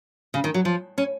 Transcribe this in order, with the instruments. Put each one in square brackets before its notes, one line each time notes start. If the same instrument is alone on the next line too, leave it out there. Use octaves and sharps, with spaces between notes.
[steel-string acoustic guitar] C#3
D#3
F#3
F3
C#4